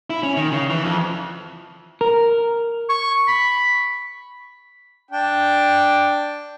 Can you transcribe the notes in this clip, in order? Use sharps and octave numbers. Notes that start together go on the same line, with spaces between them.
E4
C#4
D#3
C#3
E3
F2
A#4
C#6
B5
D4 G5